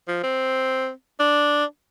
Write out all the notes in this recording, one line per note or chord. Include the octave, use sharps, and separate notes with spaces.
F3
C4
D4